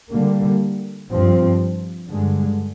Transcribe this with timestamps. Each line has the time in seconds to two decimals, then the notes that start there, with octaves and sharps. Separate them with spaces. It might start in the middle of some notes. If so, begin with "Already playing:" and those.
0.10 D3 G3 A#3
1.10 G2 F3 C4
2.09 G2 D3 G#3